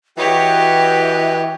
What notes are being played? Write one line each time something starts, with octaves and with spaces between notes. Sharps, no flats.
E3 F#4 G4 B4 C#5 D#5 G5